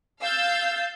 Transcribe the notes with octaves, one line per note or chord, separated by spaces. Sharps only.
F5 E6 G6 A6